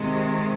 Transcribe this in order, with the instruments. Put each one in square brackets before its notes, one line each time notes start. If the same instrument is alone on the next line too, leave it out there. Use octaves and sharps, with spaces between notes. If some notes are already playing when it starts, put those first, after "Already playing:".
Already playing: [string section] C3 D#3 G#3